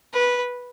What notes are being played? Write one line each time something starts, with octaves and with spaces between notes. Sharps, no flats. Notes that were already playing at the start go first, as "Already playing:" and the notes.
B4